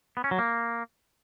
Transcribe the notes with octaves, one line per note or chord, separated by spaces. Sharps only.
B3
C#4
F#3
A#3